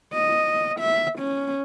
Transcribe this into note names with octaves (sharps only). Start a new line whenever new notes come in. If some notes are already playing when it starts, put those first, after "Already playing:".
D#5
E5
C#4